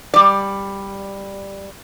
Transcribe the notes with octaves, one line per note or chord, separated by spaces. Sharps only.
G3 D5